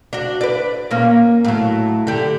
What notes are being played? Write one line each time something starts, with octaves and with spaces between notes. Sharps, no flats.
D4 F#4
B4 D5
A#2 A#3 C#4
A2 F#3
D3 G4